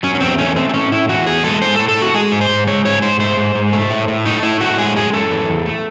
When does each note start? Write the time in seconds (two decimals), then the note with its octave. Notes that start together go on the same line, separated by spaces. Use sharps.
0.03 F#3 C#4
0.15 C#4
0.20 E2 C4
0.38 A3 C#4
0.56 A3 C4
0.69 C4
0.74 A2 C#4
0.92 A2 E4
1.08 E3 F#4
1.27 E2 G#4
1.44 G#3 A4
1.62 G#3 C5
1.75 A2 A4
1.88 A4
1.97 A2 F#4
2.14 G#3 G#4
2.32 G#2
2.41 C5
2.49 G#2
2.67 G#3 C#5
2.85 G#2 C#5
3.02 G#2 C5
3.20 A3 C5
3.37 G#2
3.55 G#2
3.73 A3
3.90 A2
4.08 A2
4.25 A3 D#4
4.43 A2 E4
4.60 A2 F#4
4.78 G#3 G#4
4.96 F#2 G#4
5.13 F#2 A4
5.31 E3
5.49 E2
5.66 A3